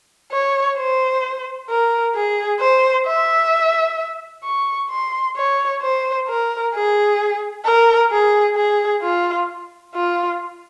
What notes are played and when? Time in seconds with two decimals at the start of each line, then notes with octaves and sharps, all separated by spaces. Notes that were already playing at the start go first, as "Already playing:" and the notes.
0.32 C#5
0.78 C5
1.70 A#4
2.15 G#4
2.61 C5
3.07 E5
4.44 C#6
4.90 C6
5.36 C#5
5.82 C5
6.28 A#4
6.74 G#4
7.65 A#4
8.11 G#4
8.57 G#4
9.02 F4
9.95 F4